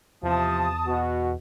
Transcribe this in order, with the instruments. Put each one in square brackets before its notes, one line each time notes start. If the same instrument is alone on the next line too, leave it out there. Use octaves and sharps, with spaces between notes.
[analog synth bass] E2 [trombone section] C3 F3 [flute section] A5 D#6
[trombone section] B2 F#4